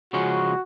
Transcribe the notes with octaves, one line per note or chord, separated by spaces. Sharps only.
C#3 F3 G#3 C#4 F#4